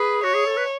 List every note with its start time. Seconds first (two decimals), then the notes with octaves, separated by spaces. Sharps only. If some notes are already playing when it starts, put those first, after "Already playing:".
Already playing: G#4 B4
0.24 F#4 C#5
0.34 G#4
0.46 A4
0.57 B4